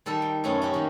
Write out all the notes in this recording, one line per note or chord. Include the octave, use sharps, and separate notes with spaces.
D#3 G3 A4 A#4
G5
F#2 C3 A3 B3 C#4
C#4 F#4 G4
D#3 A#3